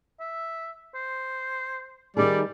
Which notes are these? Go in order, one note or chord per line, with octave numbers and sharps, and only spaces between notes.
E5
C5
D#3 G3 D#4 G#4 D5